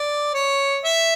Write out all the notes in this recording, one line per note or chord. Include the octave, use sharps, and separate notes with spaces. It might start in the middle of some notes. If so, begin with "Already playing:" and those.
Already playing: D5
C#5
E5